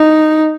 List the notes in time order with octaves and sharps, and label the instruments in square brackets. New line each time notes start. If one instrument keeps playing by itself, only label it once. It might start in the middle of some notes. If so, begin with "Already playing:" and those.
Already playing: [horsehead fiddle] D#4